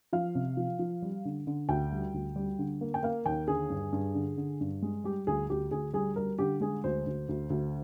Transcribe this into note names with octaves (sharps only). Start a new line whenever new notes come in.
F3 F5
C3
F3
F3
G3
D3
D3
D2 G5
G3
D2
G3
D3
A#3
G5
A#3 F5
D#2 G5
D3 G#4
G2
G2
D3
D3
G2
G#3
G3 G4
D2 G#4
D2 G4
D2 G#4
G3 G#4
G3 A#4
D3 G4
G#3 G#4
D2 C5
D2
D2
D2